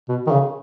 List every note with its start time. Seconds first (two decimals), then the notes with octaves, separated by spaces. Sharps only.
0.09 B2
0.27 D#3
0.31 C#3